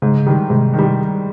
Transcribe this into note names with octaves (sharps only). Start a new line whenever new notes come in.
G#2 C#3
D#3 G3
G#2 C3
D#3 G3